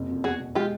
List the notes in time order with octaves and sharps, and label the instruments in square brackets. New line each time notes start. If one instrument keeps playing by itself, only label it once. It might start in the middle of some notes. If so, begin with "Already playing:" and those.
Already playing: [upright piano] F#1 C3
F2
[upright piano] E2 [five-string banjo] F#4 G#4
[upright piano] B2
[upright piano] G#3 [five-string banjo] F4 G4